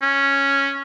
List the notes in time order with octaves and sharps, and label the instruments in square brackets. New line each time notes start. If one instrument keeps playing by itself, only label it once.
[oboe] C#4